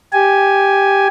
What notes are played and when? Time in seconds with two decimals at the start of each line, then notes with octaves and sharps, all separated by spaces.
0.13 G4 G#5